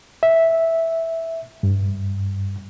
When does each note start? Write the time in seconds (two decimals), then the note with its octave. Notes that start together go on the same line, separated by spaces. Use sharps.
0.23 E5
1.63 G2